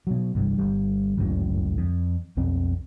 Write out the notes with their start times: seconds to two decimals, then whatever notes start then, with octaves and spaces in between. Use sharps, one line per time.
0.07 B2 F#3
0.35 G1 C2 G2
0.58 G1 G3
1.17 G1 C#2 F#2 A2
1.78 F2
2.37 B1 F2 C4